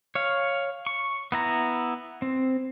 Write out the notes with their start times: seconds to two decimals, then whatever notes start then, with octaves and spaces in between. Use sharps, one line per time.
0.15 C#5 F5
0.87 C#6
1.32 B3 E4 A#5
2.22 C4